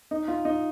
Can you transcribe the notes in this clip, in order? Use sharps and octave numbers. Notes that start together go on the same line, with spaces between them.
D#4
F4
D#4